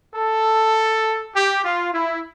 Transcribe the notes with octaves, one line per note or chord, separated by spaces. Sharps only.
A4
G4
F4
E4